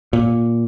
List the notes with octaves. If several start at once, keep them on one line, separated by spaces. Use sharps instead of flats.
A#2